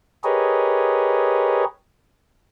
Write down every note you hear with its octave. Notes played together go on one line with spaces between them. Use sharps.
G4 G#4 A#4 B4 C#5 D#5